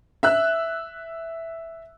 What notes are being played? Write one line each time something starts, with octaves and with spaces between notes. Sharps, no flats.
E5 E6 F#6